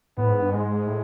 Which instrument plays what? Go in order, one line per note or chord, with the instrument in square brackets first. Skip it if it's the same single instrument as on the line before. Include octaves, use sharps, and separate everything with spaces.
[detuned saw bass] A2 [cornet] B3
[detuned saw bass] G#2
G2
[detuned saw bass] G#2 [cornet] G#3
[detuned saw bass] A2